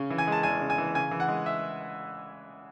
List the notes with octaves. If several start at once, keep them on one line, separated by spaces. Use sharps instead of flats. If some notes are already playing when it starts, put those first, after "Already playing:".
Already playing: C#3 C#4
E3
G#5
G#3 A5
E2 G#5
C#3
G#5
E3
C#3 G#5
E3
F#5
G#3
E5